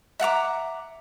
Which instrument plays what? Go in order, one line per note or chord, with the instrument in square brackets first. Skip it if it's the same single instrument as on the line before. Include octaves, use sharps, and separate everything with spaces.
[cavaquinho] E5 F#5 A#5 D6